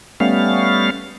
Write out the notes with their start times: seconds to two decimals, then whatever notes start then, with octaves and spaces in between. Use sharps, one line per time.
0.20 G3 A3 B3 C#4 F5